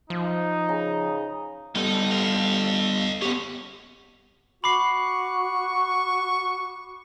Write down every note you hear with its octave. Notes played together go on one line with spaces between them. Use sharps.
F3 D#4
C#3 A#5
G3 B3 D#4 A4
D#5 F5
B3 C#4 G4
F#4 B5 C#6 D6 C7